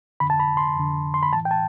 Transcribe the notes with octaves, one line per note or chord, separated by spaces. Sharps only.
F2 D3 B5
A5
B5
C6
F2 D3
C6
B5
A2 E3 A5
G5
A5